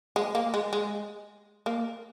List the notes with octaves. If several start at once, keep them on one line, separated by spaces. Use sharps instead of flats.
G#3
A#3
G#3
G#3
A#3